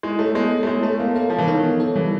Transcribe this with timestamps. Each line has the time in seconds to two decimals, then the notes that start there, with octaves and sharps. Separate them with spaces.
0.03 G#3 E4
0.19 A3 C#5
0.35 G#3 B3
0.51 A4
0.63 A3
0.67 G#3 E4
0.83 A3 C#5
1.00 A#3 B3
1.16 A#3 A4
1.30 F3 E4
1.38 E3
1.48 D#3 C#5
1.63 B3
1.80 A4
1.96 E3 G3